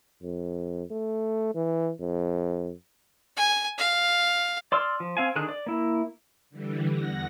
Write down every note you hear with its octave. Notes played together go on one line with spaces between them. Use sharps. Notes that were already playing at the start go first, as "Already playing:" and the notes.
F2
A3
E3
F2
G#5
F5
D5 C6 E6 F6
F3
C4 F5 G#5
D3 D#3 D4 G#4 F#6
D5
A#3 E4
D3 E3 G3
E2 F#5 A#6